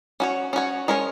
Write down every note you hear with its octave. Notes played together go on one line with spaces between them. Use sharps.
C#4 F#4 C#5
C#4 F#4 C#5
G#3 C#4 A#4 C#5